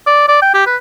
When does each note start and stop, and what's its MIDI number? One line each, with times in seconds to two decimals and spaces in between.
0.07 0.26 74
0.28 0.38 74
0.42 0.51 79
0.55 0.66 67
0.67 0.76 71